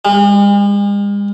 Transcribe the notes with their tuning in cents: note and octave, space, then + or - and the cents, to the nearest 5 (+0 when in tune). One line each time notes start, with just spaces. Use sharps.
G#3 -45